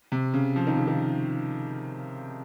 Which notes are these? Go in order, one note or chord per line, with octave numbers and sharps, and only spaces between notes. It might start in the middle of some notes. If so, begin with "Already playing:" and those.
C3
C#3
F3
D#3
C#3
D#3